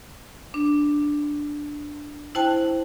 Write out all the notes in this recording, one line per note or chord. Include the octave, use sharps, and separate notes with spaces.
D4
E4 C5 G5 A5 F#6